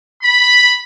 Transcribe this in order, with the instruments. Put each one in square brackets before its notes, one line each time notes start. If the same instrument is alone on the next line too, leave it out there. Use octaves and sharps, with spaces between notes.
[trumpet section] B5